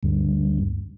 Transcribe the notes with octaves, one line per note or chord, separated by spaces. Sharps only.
D2 G2